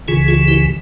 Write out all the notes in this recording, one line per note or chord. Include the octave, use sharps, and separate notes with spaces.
C#2 C#3 E3 F4 G#4
F4 G#4
E4 G4